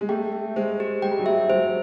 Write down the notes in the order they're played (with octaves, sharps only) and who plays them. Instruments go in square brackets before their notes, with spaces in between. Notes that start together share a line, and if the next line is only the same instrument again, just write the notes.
[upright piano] G#3
[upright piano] A3 [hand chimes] G5
[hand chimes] E5
[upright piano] G#3 [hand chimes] C5
[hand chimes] G4
[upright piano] G#3 [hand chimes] G5
[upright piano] G3
F#3
[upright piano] G3 [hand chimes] E5
[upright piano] F#3 [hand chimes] C5